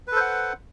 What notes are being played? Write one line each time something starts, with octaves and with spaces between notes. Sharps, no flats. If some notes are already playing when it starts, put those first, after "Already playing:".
A4 B4 C5 F#5